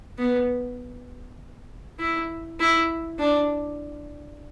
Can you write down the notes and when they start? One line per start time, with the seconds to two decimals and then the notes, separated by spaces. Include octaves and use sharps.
0.18 B3
1.99 E4
2.60 E4
3.19 D4